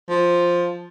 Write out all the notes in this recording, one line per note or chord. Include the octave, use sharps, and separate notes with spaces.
F3